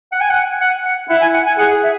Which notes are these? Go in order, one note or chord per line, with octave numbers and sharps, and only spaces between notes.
F#5
G#5
F#5
F#5
F#5
E4 F#5
G#5
F#5
G#5
G#4 F#5
E5